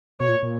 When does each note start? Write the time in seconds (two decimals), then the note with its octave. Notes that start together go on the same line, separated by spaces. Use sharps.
0.20 B2 C#5
0.28 A#2
0.43 A#2